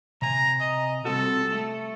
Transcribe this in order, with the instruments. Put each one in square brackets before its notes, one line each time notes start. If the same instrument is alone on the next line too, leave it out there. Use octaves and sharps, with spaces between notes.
[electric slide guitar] C3 G#5 [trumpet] A#5
[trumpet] D#5
[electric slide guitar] G3 C4 F#4 [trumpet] A4
[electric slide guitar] A3